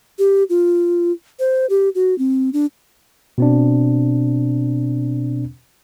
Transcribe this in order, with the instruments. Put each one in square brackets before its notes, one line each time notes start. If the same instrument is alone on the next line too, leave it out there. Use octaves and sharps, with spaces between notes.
[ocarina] G4
F4
C5
G4
F#4
C4
D4
[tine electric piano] B2 C4 D4